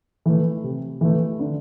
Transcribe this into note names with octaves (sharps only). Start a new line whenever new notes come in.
E3 A3
C3
E3 A3
D3